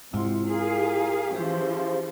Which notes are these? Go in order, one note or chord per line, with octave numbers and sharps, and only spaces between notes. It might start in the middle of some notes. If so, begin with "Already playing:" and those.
G#2 C3 E4 F4 C6
G#4 A#4 F5
E3 F3 C#4 G4 G#4 C5